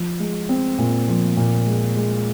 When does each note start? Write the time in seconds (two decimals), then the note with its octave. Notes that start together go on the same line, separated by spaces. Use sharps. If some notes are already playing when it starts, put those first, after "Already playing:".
Already playing: F3
0.20 G#3
0.49 C4
0.78 A#2
1.08 F3
1.37 A#2
1.67 G#3
1.96 G#3